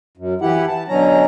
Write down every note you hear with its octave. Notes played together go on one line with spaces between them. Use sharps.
F#2
E3 E4 G4 F#5
A5
B2 D3 F#3 C#4 A#5